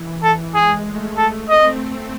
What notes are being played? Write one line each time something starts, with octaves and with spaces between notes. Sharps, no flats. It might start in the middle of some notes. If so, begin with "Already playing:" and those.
Already playing: E3
A4
G#3 G#4
A3
A4
C4 D#5